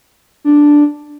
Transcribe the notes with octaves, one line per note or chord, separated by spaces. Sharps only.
D4